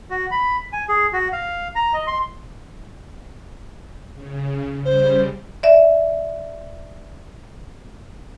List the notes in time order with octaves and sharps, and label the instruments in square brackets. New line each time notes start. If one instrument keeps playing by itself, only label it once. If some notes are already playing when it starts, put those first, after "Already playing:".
[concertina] F#4
B5
G#5
G#4
F#4
F5
A#5
D#5
C6
[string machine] C#3
[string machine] C#3 G3 [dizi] C5
[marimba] D5 E5